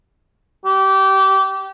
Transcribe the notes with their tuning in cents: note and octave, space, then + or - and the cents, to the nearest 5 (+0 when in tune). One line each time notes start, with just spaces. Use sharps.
G4 -25